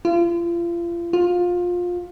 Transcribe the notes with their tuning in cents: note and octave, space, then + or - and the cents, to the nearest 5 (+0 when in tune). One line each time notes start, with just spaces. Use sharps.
F4 -35
F4 +20